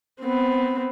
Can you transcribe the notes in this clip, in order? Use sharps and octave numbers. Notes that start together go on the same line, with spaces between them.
B3 C4